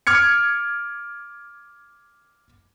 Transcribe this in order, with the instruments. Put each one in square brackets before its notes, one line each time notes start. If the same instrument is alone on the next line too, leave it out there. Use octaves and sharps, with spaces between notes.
[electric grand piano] D6 F6 G#6 C#7